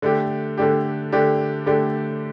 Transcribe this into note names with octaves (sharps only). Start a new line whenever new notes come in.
D3 A3 D4 G4
D3 A3 D4 G4
D3 A3 D4 G4
D3 A3 D4 G4